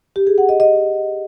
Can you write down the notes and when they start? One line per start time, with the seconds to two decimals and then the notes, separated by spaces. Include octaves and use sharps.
0.16 G4
0.27 G#4
0.38 F#5
0.49 D#5
0.60 D#5